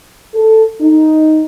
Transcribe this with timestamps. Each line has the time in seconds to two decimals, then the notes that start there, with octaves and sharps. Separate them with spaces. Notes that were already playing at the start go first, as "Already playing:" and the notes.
0.33 A4
0.81 D#4